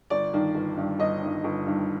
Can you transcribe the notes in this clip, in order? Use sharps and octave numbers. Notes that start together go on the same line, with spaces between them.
G1 D5
G2 D#3
G1
G2 D#3
G1 D#5
G2 D#3
G1
G2 D#3